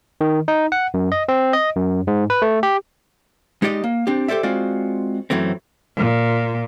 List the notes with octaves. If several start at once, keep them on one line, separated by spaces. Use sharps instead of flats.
D#3
D#4
F#5
F#2
D#5
C4
D#5
F#2
G#2
B4
A3
G4
G#3 D#4 G4 D5 D#5
A#3
C4 D4 G4
G4 A4 C5 D5 E5
G#3 C4 F4 F#4 D5
F#2 E3 F#3 A3 C4
A#2